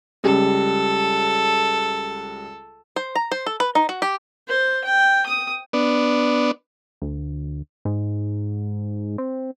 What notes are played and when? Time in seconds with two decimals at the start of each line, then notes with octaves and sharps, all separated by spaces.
0.24 C#2 G3 A4
2.96 C5
3.15 A#5
3.32 C5
3.46 A4
3.60 B4
3.75 D#4
3.89 F#4
4.02 G4
4.48 C5
4.84 G5
5.26 D#6
5.73 B3 D4
7.02 D2
7.85 G#2
9.18 C4